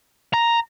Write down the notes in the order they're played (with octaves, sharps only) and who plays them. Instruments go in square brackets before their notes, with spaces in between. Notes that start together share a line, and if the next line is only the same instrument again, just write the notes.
[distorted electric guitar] A#5